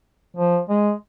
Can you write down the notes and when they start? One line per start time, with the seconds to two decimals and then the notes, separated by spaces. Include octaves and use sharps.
0.36 F3
0.69 G#3